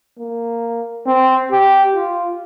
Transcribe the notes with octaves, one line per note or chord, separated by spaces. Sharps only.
A#3
C4
G4
F4